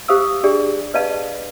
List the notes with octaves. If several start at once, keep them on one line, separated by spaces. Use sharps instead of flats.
G4 C5 F5 D#6 E6
D4 G4 G#4 D5
B4 D5 D#5 F5 A5